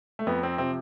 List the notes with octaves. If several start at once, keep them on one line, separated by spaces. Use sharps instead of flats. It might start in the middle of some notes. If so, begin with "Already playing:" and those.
A3
F2 B3
C4
C3 F3 C4